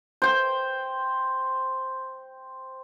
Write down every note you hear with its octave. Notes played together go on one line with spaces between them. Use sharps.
C5 G5